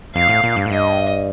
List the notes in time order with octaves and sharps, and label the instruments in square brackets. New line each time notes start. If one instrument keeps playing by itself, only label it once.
[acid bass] F2 [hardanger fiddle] F5
[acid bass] A2
A#2
G2
A2
[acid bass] G2 [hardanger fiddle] D#5